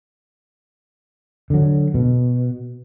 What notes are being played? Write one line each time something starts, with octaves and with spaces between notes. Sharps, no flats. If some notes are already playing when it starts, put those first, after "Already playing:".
D3 F#3
B2